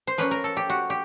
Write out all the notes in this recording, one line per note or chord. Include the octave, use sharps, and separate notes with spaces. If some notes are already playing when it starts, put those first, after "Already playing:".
C5
F3 A#3 C#4 B4
A#4
A4
G4
F#4
G4